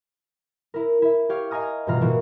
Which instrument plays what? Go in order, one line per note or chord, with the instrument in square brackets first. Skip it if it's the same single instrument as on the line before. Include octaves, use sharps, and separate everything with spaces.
[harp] E4 A#4
E4 E5
G4 C#5 F5
D#5 F5 G#5 A#5 D#6 F6
G2 B2 E3 F4 A#5 F6
A#2 E3 A#3 F#4